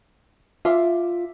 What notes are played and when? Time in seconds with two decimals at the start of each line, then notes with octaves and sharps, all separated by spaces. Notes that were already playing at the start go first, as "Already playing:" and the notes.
0.65 F4 E5 D6